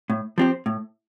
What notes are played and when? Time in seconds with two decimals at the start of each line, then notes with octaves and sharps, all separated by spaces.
0.10 A2
0.38 F3 C4 G4 C5
0.66 A2